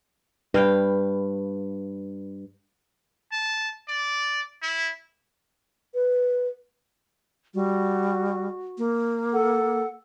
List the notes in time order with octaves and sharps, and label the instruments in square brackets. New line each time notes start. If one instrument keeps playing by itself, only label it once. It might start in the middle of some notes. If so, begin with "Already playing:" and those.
[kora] G2 F5 G5 [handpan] B4
[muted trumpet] A5
D5
E4
[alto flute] B4
[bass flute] G3 [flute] F#4
[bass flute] A#3
[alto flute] A4 [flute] F#5